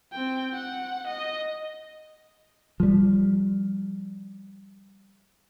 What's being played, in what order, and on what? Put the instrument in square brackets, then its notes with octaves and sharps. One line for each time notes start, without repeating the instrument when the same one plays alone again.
[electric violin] C4 G5
F#5
D#5
[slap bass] F3 G3